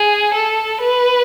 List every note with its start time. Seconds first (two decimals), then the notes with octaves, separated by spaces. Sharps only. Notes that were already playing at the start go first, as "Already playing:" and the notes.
Already playing: G#4
0.34 A4
0.82 B4